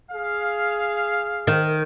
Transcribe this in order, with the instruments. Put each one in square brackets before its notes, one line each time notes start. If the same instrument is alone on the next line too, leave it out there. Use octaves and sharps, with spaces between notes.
[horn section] G#4 F5
[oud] D#3